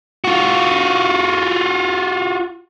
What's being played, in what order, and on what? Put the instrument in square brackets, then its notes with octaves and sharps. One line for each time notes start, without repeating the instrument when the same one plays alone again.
[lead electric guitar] F4 F#4